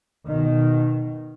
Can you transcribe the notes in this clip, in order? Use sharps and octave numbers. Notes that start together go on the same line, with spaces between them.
B2 D#3